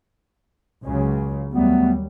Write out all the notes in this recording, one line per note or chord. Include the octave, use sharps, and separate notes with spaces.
C#2 C#3 F#3
D#2 F#3 G3 A3 B3